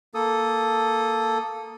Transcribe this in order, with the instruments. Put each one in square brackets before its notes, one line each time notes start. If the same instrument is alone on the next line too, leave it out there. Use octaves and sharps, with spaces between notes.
[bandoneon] A#3 A4 D#6